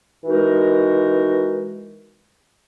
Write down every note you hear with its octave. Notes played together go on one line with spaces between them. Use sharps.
E3 G#3 D#4 F#4 A#4